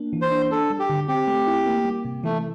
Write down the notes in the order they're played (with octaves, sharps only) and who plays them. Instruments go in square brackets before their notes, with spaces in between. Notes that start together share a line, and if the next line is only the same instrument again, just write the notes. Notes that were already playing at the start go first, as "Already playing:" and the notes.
Already playing: [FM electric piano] A#3 D4
E3
[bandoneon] C5
[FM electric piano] D4
[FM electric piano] D4 [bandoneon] A4
[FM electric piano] G3
[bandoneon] G4
[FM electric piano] D3
[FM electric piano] C4 [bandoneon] G4
[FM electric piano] A3
E4
A#3
G3
C3
[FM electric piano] E3 [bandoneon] A3